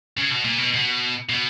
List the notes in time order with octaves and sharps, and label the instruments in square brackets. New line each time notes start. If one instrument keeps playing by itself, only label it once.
[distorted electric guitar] C#3
B2
A#2
B2
B2
B2